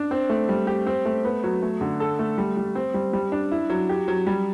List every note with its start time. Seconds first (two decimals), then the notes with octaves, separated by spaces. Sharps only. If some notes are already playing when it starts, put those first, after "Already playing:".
Already playing: D4
0.11 C4
0.30 A3
0.49 G3
0.67 G4
0.87 C4
1.05 A3
1.24 B3
1.44 F#3
1.62 A3
1.81 D3
2.00 A4
2.19 A3
2.38 G3
2.57 G3
2.75 C4
2.94 G3
3.13 G3
3.32 D4
3.52 E4
3.70 F#3
3.89 G4
4.08 F#3
4.27 G3